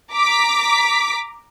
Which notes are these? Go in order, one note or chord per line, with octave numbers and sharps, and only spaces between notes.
A#5 D6 B6